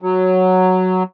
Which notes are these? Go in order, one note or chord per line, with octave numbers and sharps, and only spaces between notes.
F#3